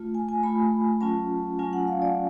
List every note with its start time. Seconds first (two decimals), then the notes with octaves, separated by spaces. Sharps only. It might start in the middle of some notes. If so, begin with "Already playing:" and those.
Already playing: A3 F4
0.15 G#5
0.29 G#5
0.43 A3 F4 B5
1.01 F#3 C#4 F4 A5
1.59 F#3 C#4 F4 G#5
1.73 F#5
1.87 F5
2.02 D5